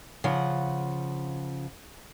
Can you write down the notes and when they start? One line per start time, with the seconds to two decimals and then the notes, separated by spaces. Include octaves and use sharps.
0.24 C#3 F3 F#5